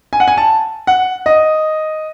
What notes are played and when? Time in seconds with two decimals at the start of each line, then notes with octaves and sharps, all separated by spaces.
0.13 G#5
0.20 F#5
0.28 G#5
0.37 A5
0.87 F#5
1.26 D#5